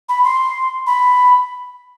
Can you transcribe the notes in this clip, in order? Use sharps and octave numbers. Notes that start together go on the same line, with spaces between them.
B5
C6
B5